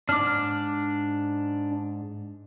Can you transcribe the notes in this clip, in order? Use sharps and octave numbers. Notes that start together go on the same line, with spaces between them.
G#2 D4 D6 F6